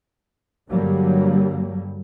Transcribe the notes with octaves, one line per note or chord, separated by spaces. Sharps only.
G2 D3 F#3 G3 A#3